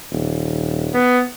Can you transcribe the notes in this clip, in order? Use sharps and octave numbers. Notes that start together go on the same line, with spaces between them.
D#1
B3